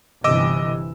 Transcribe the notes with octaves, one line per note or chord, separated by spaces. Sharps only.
G1 C3 E3 D#5 D6 E6